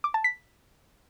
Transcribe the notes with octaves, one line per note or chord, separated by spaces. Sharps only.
D6
A5
B6